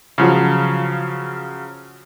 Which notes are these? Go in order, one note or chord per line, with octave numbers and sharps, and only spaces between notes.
C#3 F3 F#3